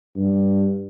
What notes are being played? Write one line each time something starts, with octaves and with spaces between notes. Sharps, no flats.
G2